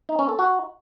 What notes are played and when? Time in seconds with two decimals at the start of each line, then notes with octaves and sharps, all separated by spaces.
0.09 D#4
0.19 C#4
0.29 A4
0.39 F#4